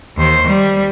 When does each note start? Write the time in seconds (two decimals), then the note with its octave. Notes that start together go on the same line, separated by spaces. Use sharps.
0.17 D#2 C5
0.47 G3